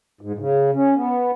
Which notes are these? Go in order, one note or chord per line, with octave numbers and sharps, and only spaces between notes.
G#2
C#3
C#4
B3